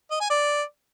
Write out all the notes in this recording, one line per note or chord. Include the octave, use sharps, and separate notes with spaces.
D#5
G#5
D5